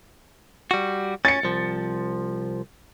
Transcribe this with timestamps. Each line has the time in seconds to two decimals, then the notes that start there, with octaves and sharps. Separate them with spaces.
0.71 G3 F#4
1.25 C#4 A6 C#7
1.43 C2 F3